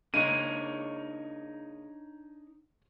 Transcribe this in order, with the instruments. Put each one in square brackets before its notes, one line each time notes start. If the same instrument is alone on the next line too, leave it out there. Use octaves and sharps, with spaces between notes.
[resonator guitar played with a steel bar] C#3 G#3 A#3 [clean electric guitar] D4 D#4 C#5 [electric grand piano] D#7